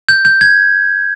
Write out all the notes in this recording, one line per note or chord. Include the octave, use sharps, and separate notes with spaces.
G6
G6
G#6